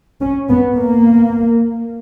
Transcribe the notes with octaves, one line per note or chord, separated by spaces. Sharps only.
C#4
B3
A#3